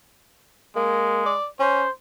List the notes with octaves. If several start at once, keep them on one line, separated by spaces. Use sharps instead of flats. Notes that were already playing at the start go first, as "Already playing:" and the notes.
G#3 A#3
D5
C#4 C5